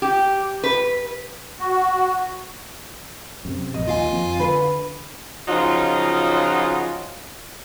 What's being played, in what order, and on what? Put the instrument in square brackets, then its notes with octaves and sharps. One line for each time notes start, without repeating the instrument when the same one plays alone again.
[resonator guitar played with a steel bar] G4
B4
[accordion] F#4
[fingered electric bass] F#2 C3
[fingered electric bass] A#1 [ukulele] D#5
[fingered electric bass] D#2 [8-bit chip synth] F4 F5 G#5
[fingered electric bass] F2
[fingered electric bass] D3 [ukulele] B4
[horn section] C#3 F3 F#3 D#4 F4